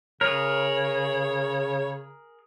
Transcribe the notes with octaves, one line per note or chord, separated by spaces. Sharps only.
C#3 G#4 A#4 C#5